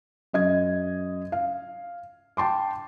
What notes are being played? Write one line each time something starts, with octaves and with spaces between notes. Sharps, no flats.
F#2 D#5 G#6
F5
G5 A5 C6 D6